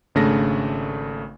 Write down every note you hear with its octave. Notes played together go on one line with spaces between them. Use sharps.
G#1 C#3 A3 D4 A#6